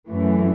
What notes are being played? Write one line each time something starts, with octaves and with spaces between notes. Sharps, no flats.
F#2 E3 A3